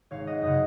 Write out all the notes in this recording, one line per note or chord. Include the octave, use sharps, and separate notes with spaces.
G#1 C#5 F5
D#5 F#5
F#2 C#3 D#5 F#5